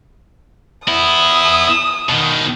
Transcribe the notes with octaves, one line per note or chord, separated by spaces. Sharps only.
B3 E4 D#6
B2 D#3